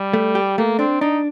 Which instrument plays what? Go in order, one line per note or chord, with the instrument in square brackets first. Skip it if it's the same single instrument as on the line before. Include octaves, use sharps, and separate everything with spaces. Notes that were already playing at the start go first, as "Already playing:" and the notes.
Already playing: [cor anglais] G3
[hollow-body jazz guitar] A3
G4
[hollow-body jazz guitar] A3 [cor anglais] A#3
[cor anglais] C4 [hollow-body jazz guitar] D4
[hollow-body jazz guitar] D4 [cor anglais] D#4